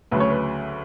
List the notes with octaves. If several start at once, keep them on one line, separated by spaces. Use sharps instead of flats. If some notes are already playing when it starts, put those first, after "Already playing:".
D2 C#3 F#3 A3 B4
C#5
B4